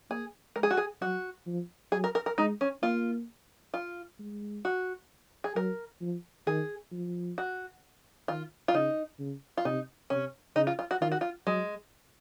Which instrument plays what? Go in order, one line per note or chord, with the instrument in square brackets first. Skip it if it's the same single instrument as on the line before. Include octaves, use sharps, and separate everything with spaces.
[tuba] A#3 [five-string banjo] G#4
[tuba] G#3 [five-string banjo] A#4
[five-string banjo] G#4
F#4
G#4
[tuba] F#3 [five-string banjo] F#4
[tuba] F3
[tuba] F#3 [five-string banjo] G#4
[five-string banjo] A#4
A#4
A#4
[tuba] G#3 [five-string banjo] D#4
[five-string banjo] C#4
[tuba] A#3 [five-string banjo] F4
[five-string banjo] F4
[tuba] G#3
[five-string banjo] F#4
G#4
[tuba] F#3 [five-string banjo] A#4
[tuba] F3
[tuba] D#3 [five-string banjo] G#4
[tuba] F3
[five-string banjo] F#4
[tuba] D#3 [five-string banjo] F4
[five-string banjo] F4
[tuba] C#3 [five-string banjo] D#4
[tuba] C#3
[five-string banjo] F4
[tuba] C3 [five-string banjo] D#4
[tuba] C3 [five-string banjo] C#4
[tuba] C#3 [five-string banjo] D#4
[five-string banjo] F4
F4
F#4
[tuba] D#3 [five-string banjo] F4
[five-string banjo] F#4
F4
[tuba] F#3 [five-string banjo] G#3